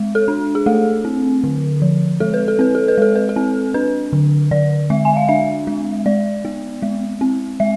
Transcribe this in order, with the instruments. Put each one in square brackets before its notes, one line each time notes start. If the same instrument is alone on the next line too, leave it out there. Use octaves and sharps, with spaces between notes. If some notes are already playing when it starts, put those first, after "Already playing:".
Already playing: [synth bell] G#3
A4
D4
G#4
A3 A4
C4
D3
F3
G#3 A4
B4
A4
C4 B4
A4
B4
G#3 A4
B4
A4
C4
D4 B4
D3
D3 D5
G#3 E5
G#5
F5
D4 E5
G#3
G#3 D5
B3
G#3
C4
G#3 E5